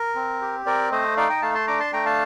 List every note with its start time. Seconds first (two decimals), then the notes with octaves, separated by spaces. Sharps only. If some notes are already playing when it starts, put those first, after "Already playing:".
Already playing: A#4
0.15 C4
0.41 G4
0.66 C4 A#4 D5
0.91 A3 C5 D#5
1.17 D#4 D5 F5
1.30 D#5 G5
1.42 A3 F5 A5
1.54 A5 C6
1.67 D4 A#5 D6
1.80 A5 C6
1.93 A3 G5 A#5
2.06 F5 A5